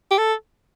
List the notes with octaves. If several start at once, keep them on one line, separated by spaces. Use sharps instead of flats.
G4
A4